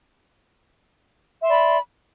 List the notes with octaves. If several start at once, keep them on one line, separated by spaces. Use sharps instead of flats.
D5 E5 B5 C6